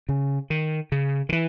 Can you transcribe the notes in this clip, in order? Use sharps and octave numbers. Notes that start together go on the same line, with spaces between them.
C#3
D#3
C#3
D#3
E3